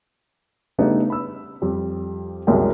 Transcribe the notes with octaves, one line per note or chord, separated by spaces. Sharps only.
C#3 G3 A3 B3 D4 D#4
B5 E6
F2 G3
C2 F#2 G#3 E4 A#4 G5